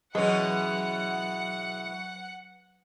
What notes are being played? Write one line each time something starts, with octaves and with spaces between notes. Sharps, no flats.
B2 E3 F#3 G#3 C#4 B4 F#5